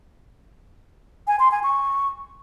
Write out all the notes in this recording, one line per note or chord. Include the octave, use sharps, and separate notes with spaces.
G#5
C6
G#5
C#6